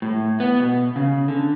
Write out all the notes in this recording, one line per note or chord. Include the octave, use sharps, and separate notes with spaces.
A2
B3
B2
C#3
D3